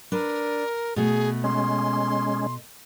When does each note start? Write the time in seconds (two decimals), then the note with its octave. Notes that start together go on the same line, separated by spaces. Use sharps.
0.12 D4 A#4 B4
0.96 B2 A3 G#4
1.44 G#3 C#4 C6